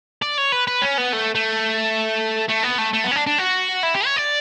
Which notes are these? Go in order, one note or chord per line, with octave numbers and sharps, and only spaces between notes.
D5
C#5
B4
B4
C#4
B3
A3
A3
A3
B3
A3
A3
B3
C#4
D4
D4
F#4
E4
G4
C#5
D5